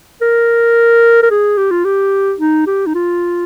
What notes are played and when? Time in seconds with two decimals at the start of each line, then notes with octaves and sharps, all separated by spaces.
0.21 A#4
1.23 A#4
1.31 G#4
1.57 G4
1.71 F4
1.84 G4
2.39 D#4
2.66 G4
2.86 D#4
2.94 F4